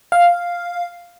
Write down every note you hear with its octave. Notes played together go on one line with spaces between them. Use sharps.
F5